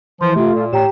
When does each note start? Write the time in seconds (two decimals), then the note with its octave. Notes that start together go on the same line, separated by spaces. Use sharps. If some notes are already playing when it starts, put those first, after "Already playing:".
0.21 E3 F3 C6
0.35 C3 A3 F4
0.55 A#2
0.72 A2 G4 C#5 G5 A#5 E7